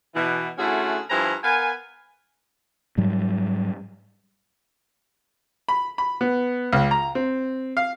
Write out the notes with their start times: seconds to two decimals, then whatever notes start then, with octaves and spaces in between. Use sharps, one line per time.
0.15 B2 E3
0.58 D3 A3 C#4 E4 F#4 G#4
1.10 G2 F3 E4 C5 G#5 A#5
1.43 B3 A#4 F5 G#5
2.98 G#2 F#3 G3
5.69 B5
5.98 B5
6.21 B3
6.73 C#2
6.91 A#5
7.15 C4
7.77 F5